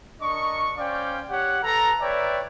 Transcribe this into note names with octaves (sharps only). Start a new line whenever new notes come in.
D4 A#4 D#5 C#6
C#4 C5 D5 F5 G5
G4 C#5 F#5
A4 B4 A#5
B4 C#5 D5 E5 G5